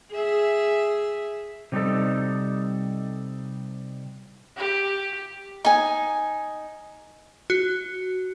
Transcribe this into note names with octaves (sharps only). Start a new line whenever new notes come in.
G#4 E5
C3 G3 D#4 A4
G4
D#4 G#5
F#4